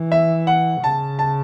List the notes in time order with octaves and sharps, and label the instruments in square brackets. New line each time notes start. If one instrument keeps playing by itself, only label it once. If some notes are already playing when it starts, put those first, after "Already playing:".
Already playing: [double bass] E3
[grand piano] E5
F#5
[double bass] C#3 [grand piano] A5
[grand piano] A5